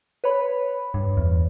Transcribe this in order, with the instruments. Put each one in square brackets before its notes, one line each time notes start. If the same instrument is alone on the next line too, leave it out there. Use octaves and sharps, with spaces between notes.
[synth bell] B4 C#5 B5
[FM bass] G2
E2